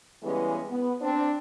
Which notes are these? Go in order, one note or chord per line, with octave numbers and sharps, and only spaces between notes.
C#3 E3 G3 G#3 B3 C#4
B3
C4 D4